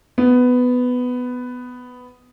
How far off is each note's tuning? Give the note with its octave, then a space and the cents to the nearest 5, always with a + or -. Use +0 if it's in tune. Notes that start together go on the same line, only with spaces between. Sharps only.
B3 +10